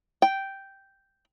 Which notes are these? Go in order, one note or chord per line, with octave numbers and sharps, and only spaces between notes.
G5